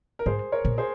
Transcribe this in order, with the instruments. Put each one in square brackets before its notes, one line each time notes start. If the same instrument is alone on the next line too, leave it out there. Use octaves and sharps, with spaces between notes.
[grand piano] A#4
[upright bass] G#2 [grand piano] G#4 C5
[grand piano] A#4 C#5
[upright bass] A#2
[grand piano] G#4 C5